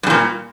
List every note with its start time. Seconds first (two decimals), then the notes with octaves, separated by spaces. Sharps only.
0.03 G2
0.07 C#3
0.10 A#2